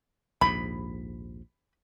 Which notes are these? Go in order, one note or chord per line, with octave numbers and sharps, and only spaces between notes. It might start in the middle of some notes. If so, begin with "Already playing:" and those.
A#1 D#2 G#2 B5